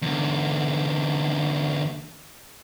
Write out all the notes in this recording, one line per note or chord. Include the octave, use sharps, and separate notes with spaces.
E2 D3